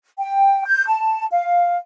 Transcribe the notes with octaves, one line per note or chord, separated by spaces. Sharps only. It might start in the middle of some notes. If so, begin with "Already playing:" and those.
G5
G6
A5
F5